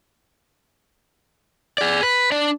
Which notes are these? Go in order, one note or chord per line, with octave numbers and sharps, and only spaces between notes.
G#4 D5
B4
D4 D5